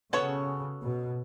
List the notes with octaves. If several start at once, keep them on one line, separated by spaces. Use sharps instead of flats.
C#3 B3 F#4 A4 C#5
B2